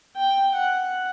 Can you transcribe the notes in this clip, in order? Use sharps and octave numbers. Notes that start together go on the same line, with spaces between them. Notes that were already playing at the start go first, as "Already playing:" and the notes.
G5
F#5